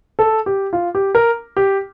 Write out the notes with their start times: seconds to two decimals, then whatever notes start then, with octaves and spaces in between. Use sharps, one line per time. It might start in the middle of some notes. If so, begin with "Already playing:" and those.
0.19 A4
0.46 G4
0.73 F4
0.95 G4
1.15 A#4
1.57 G4